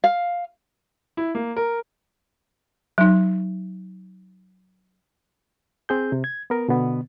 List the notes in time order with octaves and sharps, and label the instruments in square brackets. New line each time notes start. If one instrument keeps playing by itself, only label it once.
[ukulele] F5
[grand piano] E4
A#3
A#4
[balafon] F#3 D#4
[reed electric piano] C4 G#4 G6
C3
G#6
B3 A#4
B2 D3 B3